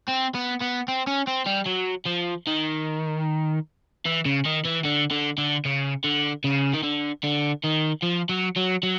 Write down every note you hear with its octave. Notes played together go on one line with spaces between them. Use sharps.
C4
B3
B3
C4
C#4
C4
G3
F#3
F3
D#3
E3
C#3
D#3
E3
D3
D3
D3
C#3
D3
C#3
D#3
D3
D3
D#3
F3
F#3
F#3
F#3